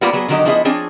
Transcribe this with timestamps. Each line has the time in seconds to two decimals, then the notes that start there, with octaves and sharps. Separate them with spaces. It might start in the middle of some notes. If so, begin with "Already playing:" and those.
0.01 G3 A#3 B3 F4 A#4 D5
0.13 F#3 B3 G#4
0.28 D3 D#3 F#3 A#3 G4 D#5
0.45 F3 B3 E4 G#4 C5 D#5
0.65 F3 C4 D4 G#4 C#5 G#5